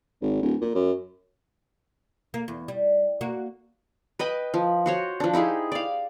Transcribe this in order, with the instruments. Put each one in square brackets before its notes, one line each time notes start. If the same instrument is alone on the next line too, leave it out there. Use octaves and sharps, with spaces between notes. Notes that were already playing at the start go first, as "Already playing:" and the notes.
[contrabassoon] G#1
D1
A#2
F#2
[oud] A#3
E2
G3
A#3 F#4
[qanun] B4 D#5 G5 B5
F3
F#4 C5 C#5
F3 D4
D#4 E4 G4 G#4
D5 F5